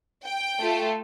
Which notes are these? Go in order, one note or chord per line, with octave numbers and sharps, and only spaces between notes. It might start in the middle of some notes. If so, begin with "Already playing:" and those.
G5
A3 F4 A4